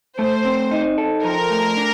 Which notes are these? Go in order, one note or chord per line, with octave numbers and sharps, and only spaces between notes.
A3 C5
C4
D#4
A4
F3 A#4
A3
D4